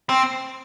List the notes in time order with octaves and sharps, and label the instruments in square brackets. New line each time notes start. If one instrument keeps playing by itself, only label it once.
[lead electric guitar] C4